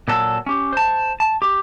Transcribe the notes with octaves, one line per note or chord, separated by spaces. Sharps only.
A#2 F#3 A4
C#4 G4
C5 A5
A5
G4